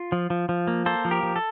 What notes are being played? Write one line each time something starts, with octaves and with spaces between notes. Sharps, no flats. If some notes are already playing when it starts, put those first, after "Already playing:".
Already playing: F4
F3
F3
F3
A#3
A#3 A4 C5
F3
G4 A#4
F3
A4